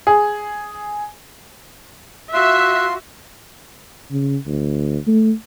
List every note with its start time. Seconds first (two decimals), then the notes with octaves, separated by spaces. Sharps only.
0.07 G#4
2.34 F4 F#4 E5 C6 F#6
4.11 C#3
4.46 D2
5.07 A3